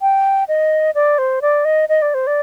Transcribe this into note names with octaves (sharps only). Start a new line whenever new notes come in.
G5
D#5
D5
C5
D5
D#5
D#5
D5
C5
D5